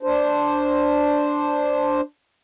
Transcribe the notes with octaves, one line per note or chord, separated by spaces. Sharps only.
D4 C5